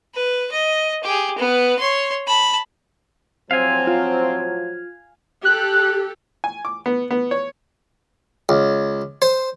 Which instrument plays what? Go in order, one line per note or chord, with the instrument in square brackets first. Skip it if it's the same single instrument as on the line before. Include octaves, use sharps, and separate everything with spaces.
[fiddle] B4
D#5
G4 G#4
B3 B4
C#5 C6
A5 B5
[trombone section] A2 F3 F#3 [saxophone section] C4 [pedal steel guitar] F5 G#5
[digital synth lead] F4
[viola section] G4 A4 [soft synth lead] F#6
[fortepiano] G#5
D6
B3
B3
C#5
[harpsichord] C#2
C5